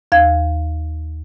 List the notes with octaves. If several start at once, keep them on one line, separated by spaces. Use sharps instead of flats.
D#2 F5 G#6